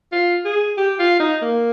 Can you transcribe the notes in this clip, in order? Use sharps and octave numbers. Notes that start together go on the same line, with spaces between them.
F4
G#4
G4
F4
D#4
A#3